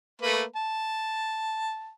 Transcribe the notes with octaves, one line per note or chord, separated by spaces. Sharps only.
A3 A#3 B4
A5